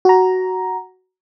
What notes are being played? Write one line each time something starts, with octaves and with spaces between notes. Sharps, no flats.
F#4 A#5